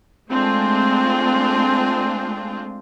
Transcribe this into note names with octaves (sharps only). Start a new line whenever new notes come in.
G#3 A3 C4 D4 F4 G#4